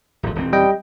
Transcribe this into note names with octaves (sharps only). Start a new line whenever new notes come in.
D1 G#1 F3
D#1 E3 C4
G3 D#5 G5